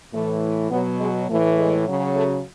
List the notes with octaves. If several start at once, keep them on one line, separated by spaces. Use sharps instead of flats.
A2 E3 A3
B2 F#3 B3
G#3
A2 E3 A3
G#3
C#3 F#3
A3